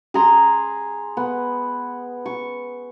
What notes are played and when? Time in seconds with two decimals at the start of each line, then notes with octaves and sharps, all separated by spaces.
0.14 G#4 A#5 C6
1.17 B3
2.26 C#6